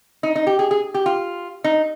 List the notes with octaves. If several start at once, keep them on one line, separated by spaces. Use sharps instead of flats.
D#4
D#4
G4
G#4
G#4
G4
F4
D#4